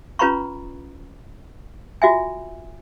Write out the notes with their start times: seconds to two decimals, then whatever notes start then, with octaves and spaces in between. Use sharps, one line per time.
0.19 C#4 F4 B4 A#5 B5 C#6
2.02 F4 F#4 E5 G#5